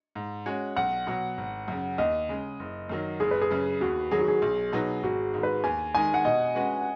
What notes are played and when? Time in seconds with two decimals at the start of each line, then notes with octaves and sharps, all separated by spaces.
0.15 G#2
0.46 G#3 C#4 F#4 C#5
0.76 B1 F#5
1.07 B2 F#3
1.37 G#1
1.68 F#2 C#3
1.98 D#2 D#5
2.29 C#3 G#3
2.59 F#1
2.89 F#2 D#3 F#3
3.20 F#1 G#4
3.31 B4
3.42 G#4
3.51 F#2 C#3
3.81 D#2 F#4
4.11 D#3 F#3 G#4
4.20 F#4
4.28 G#4
4.42 B1
4.73 B2 F#3 D#4 B4
5.03 G#1 F#4
5.34 G#2 D#3
5.43 B4
5.64 D#2 G#5
5.95 D#3 G#3 D#4 G#5
6.14 F#5
6.25 B2 D#5
6.55 G#3 C#4 F#4 B4